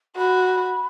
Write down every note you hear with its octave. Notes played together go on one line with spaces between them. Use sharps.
F#4 B5